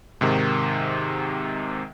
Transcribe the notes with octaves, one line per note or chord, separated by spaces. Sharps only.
G#2 C3 D#3